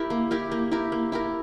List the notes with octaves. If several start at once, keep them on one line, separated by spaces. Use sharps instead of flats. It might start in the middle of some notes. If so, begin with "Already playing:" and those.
Already playing: E4 G4 A#4
A#3
E4 G4 A#4
A#3
E4 G4 A#4
A#3
E4 G4 A#4